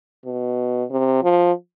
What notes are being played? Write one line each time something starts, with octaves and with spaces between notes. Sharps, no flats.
B2
C3
F3